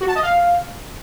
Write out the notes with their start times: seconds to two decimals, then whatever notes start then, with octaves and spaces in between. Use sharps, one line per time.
0.01 F#4
0.08 A5
0.16 D#5
0.23 F5